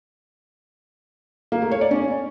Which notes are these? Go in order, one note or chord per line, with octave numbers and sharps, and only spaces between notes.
A#3
A3
C#5
D5
C#4